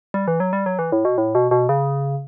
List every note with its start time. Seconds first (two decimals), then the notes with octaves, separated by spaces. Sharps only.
0.14 G3
0.28 E3
0.40 F#3
0.53 G3
0.66 F#3
0.79 E3
0.92 A2
1.05 B2
1.18 A2
1.35 B2
1.51 B2
1.69 C#3